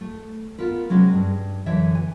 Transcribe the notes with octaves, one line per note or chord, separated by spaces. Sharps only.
A3
B3 F4 A#4 B4
C3 F#3 G#3 C#4
G2
F#2 D3 E3 C#5 E5
G#5